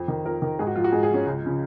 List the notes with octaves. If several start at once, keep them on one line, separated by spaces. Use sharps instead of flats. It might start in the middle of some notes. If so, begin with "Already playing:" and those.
Already playing: F2
D#3
F2 A#4
D#3
G#2 G#4
F#4
F3 F4
F#4
G#2 G#4
G#4
F3
C#4
C#2
C#3 F3